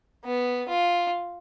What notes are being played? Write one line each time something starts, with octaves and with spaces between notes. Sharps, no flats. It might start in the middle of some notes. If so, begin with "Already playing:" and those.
B3
F4